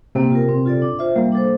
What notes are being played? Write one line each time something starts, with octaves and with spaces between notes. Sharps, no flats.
C3 A#3 C4
F4 A#4
C4
F4 A4 D5
D4
F4 C5 E5
G3 A#3
D4 A4 C5